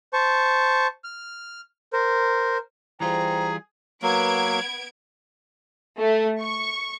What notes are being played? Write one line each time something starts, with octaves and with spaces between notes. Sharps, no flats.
C5 A5 C#6
F6
A#4 C5
E3 G3 F4 G#4 C5 G5 A#5
F#3 A#3 B3 G#6 D7
A3
C#6